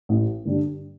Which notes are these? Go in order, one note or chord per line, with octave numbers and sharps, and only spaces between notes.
A1
G2 D3 G3 D4